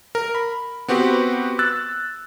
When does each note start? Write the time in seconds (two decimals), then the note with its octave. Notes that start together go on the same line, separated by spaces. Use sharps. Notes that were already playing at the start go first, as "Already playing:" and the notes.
0.15 A#4
0.35 B5
0.88 B3 C4 F#4 G4 B4
1.59 E6 F#6 A6